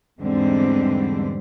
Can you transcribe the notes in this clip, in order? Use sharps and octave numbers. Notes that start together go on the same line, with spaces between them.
E2 G#2 D3 G3 C4